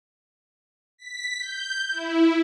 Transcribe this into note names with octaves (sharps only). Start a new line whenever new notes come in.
B6
G6
E4